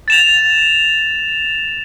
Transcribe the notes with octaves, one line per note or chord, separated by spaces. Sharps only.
A6 E7 F7